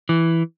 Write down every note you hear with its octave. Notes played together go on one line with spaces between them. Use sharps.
E3